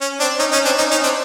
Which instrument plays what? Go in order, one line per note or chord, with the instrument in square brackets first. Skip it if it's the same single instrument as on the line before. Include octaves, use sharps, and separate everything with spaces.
[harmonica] C#4
C4 D4
C#4 D#4
C#4 D#4
C4 D4
C#4 D#4
C#4 D#4
C4 D4